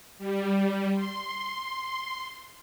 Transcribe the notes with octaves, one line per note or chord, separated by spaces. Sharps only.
G3
C6